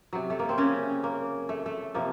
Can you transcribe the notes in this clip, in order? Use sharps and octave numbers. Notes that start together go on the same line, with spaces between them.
C3 F#3
A3
A#3
C4
C#3 C#4
A#3
A3
A3
C3 F3 A#3